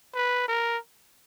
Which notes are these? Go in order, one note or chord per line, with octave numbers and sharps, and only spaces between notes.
B4
A#4